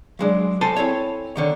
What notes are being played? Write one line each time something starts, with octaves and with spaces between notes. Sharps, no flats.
F#3 G#3 D4
A4 C5 G#5 A5
C4 E4 A4 C#5
D3 D#3 C#5